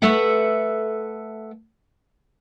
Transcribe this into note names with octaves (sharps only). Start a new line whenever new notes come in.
A3 A4 B4 E5 F#5